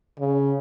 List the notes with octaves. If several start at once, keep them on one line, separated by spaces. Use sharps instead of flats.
C#3